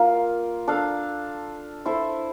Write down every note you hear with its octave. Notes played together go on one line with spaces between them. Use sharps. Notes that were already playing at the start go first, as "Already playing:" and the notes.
Already playing: A#3 F4 A#4 F5
D4 A4 D5 F5
E4 A4 C5 E5